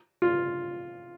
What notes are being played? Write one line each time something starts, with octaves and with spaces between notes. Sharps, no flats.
F4